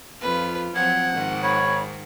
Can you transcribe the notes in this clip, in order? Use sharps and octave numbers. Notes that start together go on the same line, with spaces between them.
F2 F4 B4
F3 F#3 C4 F#5 G#6
G#2 D#3
C#5 B5